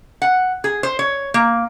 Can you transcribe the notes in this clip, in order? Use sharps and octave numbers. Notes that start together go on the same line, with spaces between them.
F#5
G#4
C5
C#5
A#3